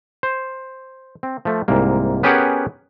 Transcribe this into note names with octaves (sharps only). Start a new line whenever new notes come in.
C5
C4
F3 A3
C2 G#2 A#3
B3 C#4 G4 G#4 A#4 F#5